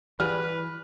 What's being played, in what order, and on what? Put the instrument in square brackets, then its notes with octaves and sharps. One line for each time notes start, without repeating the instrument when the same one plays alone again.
[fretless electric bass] E3 [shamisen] G3 F#4 G#4 [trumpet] B4 [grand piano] F6